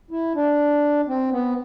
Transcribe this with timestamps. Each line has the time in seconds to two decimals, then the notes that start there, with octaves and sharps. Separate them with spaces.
0.11 E4
0.35 D4
1.08 C4
1.32 B3